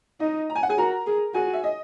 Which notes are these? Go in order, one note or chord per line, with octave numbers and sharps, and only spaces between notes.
D#4 D#5
A#5
G#5
F#5
G#4 G#5
F#4 A#4 A#5
G#4
F#4 G#4 G#5
E5
D#5